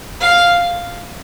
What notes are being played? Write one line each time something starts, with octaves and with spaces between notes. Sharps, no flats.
F5